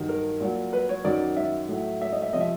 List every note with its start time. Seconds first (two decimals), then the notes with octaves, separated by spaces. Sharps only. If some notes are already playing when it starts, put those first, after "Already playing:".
Already playing: G2 D#3 F#3
0.09 A#4
0.40 A#2 F#3
0.73 B4
0.89 C#5
1.04 F#2 D#3 F#3 D5
1.37 E5
1.68 A2 F#3
2.02 E5
2.12 D#5
2.22 E5
2.33 C3 F3 D#5
2.41 E5